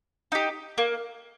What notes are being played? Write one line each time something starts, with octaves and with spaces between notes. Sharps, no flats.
D#4 G4
A#3